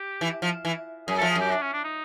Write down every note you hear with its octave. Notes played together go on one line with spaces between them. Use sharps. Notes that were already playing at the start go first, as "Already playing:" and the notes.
Already playing: G4
E3
F3
E3
F#2 G#4
A4
F3
G#4
F#2
G4
D4
C#4
D4
D#4